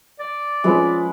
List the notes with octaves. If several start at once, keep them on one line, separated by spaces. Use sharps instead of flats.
D5
F3 G#3 C#4 B4